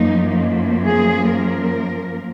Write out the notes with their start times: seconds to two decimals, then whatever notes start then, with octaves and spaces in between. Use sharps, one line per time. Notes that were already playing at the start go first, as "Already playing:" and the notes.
Already playing: F#2 F3 A#3 D#4
0.86 G#4
1.30 A#4